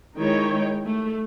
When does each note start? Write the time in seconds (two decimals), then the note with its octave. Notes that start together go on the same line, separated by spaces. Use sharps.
0.17 D#3 G#3 D#4 E4 C#5 G5
0.86 A3